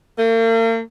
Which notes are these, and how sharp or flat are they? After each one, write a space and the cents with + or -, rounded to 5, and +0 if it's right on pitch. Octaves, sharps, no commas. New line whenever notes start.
A#3 -45